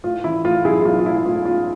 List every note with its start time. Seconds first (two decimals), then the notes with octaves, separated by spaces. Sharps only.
0.04 A2 F4
0.24 E3 E4
0.44 A2 F4
0.64 B1 E4 G#4
0.81 E4
0.85 B1 F4
0.99 F4
1.05 A2 E4
1.26 A2 F4
1.45 A2 F4